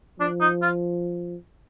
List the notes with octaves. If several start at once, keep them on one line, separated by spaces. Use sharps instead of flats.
F3 D4
D#4
F4